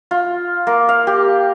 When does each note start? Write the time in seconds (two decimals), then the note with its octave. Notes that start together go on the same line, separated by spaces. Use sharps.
0.11 F4
0.67 A#3
0.89 F5
1.07 G4